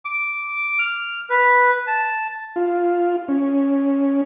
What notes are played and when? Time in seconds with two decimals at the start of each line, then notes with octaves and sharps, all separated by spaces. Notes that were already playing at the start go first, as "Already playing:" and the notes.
0.05 D6
0.79 F6
1.30 B4
1.87 A5
2.56 F4
3.28 C#4